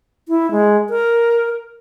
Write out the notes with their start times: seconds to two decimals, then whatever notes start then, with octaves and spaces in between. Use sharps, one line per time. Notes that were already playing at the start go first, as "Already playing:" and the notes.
0.28 E4
0.51 G#3
0.90 A#4